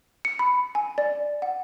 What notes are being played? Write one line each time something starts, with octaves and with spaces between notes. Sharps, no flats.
C#7
B5
G#5
D5
F#5